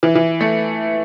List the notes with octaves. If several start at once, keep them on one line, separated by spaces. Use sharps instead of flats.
E3
E3
A3